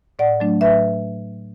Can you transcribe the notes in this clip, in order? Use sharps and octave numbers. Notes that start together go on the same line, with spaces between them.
A2 D5 F#5
F#3 A3 D4
A2 B4 E5